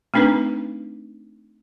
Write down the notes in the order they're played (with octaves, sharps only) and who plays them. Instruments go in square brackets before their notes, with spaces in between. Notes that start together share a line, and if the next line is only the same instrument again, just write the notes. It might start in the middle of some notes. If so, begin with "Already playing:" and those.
[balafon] A3 C4 D4 D#4 B4